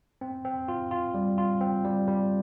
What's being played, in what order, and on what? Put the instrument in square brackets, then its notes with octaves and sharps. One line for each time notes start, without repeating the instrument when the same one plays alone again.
[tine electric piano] C4
C4
F4
F4
G3
F4
C4
G3
G3